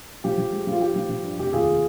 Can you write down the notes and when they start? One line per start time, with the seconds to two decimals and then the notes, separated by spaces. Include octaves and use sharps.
0.24 F3 G4
0.38 F3
0.52 G#3
0.67 F3
0.72 F4
0.81 D#4 G4
0.96 F3
1.10 F3
1.24 G2
1.39 F1 G4
1.53 D#2 F4 G#4